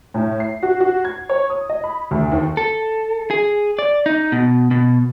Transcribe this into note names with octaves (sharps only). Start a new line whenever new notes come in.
A2
C7
F#4
F#4
G#6
C#5
D#6
D#5
B5
D2
D#2
A4
G#4
D5
D#4
B2
B2